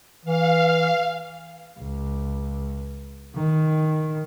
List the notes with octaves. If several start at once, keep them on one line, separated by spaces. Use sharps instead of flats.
E3 F5
C#2
D#3